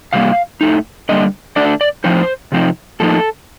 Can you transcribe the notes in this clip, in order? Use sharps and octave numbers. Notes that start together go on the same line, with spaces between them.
C3 G3 A#3 F5
A2 A3 D#4
D3 G3 A#3 D#5
D3 A3 D4 D5
D5
A2 F3 C4 D#4 C5
C3 F3 C4 D#4
A2 F3 A#3 D#4 A4